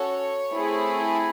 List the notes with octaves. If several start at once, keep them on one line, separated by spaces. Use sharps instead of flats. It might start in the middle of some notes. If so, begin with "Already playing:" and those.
Already playing: C#4 F#4 A4 C#5
A3 C4 E4 G#4